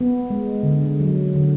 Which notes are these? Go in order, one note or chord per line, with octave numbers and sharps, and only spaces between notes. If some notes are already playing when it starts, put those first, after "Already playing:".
B3
G#3
D3
F#3
D3